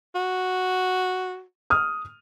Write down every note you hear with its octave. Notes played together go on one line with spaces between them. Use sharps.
F#4
D#6 F6